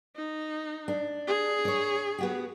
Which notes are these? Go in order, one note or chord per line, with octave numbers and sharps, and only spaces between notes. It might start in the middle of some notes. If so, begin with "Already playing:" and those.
D#4
D4
G#4
C#5 D5
B3 F#4 G4